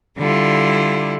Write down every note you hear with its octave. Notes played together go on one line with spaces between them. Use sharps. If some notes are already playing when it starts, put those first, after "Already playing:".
D3 G3 E4 F4